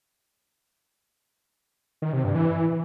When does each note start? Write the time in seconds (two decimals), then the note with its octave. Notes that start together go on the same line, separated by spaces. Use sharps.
2.02 D#3
2.13 C3
2.24 G2
2.35 E3